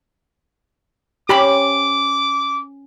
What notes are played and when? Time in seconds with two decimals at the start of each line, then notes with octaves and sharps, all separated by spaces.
1.29 C#4 G4 C5 E5 B5 D6